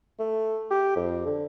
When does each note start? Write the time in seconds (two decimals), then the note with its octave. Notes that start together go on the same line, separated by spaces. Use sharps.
0.19 A3
0.70 G4
0.96 F2
1.26 D3